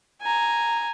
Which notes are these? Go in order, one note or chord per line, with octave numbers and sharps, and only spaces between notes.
G#5 A#5